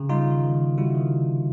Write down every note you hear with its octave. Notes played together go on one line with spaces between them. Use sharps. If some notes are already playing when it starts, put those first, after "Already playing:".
Already playing: C#3
G3 D#4 F4
D#3
D#3
D#3
G3 E4 F#4
D#3
C3
C3